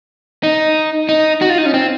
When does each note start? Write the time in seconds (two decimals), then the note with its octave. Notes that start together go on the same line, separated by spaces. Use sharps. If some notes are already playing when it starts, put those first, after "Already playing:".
0.43 D#4
1.09 D#4
1.42 F#4
1.50 F4
1.58 D#4
1.66 C#4
1.74 C4